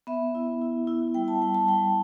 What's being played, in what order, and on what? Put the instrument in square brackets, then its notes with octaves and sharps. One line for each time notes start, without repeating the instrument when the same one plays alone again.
[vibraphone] B3 E5
E4
E4
E4
G3 G5
A5
G3 G5
A5
G3 G5